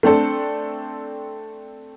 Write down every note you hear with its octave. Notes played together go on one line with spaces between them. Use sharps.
A3 C4 D4 A4